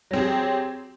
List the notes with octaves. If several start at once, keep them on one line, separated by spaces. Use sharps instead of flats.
F#3 C4 G4 G#4